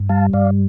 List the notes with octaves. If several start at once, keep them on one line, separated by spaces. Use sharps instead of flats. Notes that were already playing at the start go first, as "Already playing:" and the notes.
Already playing: G2
G3 F5 A5
G2 D5 F5